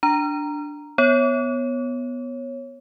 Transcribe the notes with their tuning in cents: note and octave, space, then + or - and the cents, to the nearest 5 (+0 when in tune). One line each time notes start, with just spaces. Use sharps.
D4 +0 A#5 +0
B3 +0 C#5 -15